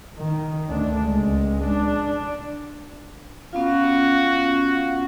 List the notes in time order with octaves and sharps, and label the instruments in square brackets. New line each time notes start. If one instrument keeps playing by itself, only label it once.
[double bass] D#3
D2 D4
C#2 G#3
D4
[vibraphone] B3 C#4 F4 [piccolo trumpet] F#4 [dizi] F5